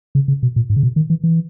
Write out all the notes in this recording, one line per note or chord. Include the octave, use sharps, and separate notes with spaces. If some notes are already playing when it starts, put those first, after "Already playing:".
C#3
C#3
B2
A#2
G#2
C#3
B2
D#3
E3
E3